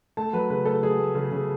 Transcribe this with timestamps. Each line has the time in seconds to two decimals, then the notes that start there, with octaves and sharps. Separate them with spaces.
0.17 A3 A5
0.33 F#3 B4
0.50 C#3 B4
0.65 A3 A4
0.83 F#3 G#4
0.99 A3
1.15 C#3
1.32 C#3